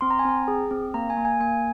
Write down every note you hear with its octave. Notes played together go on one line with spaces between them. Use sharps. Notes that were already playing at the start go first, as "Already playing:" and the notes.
C4 C6
A#5
G#5
C4 A#5
G#4
C4
A#3 A#5
G#5
A#3
G#5
A#3 G#5